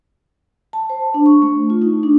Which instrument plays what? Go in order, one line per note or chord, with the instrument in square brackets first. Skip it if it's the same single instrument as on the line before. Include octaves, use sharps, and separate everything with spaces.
[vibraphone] A5
C5
D4
C#6
A3
F4
D#4
D4